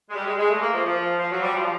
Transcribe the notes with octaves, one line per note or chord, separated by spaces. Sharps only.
G#3
G3
G#3
G#3
A3
A#3
F3
F3
F3
F#3
G3
F3